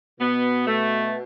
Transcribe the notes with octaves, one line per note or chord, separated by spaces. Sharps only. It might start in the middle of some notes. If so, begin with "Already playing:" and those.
B2 B3
A3